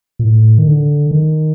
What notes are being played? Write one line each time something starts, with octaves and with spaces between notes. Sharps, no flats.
A#2
A2
D#3
D3
D#3